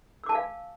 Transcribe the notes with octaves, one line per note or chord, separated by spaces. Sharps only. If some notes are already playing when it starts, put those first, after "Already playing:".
F5 G#5 A5 D6 E6